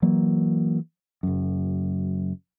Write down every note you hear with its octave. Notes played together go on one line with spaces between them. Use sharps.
E3 F#3 A#3
F#1 F#2